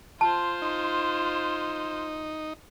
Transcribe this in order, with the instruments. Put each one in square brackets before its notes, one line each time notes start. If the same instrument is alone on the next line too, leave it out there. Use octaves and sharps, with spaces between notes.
[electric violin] F4 C5 [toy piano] A5
[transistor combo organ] D#4